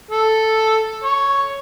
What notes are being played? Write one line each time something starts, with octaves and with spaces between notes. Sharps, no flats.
A4
C#5